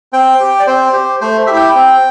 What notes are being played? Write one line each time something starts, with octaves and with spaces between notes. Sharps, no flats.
C4 G5
G4
D5
C4 C5
G4
A3 C5
E4 G4 E5
G5
C4